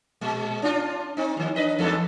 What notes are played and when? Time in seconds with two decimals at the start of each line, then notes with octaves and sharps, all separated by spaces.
0.21 A#2 G#3
0.62 C#4 D4 F4
1.17 C4 D#4
1.37 D#2 D#3
1.56 D4 B4 D#5
1.79 E2 G#2 A4